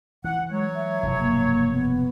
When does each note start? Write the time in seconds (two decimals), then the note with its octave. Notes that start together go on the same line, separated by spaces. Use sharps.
0.24 E3 F#5
0.51 F#3 G#3 C#5
0.74 E5
1.03 F1 G2 B2
1.20 A#3
1.72 B3